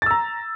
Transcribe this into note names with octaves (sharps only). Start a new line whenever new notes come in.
A#5 E6 A6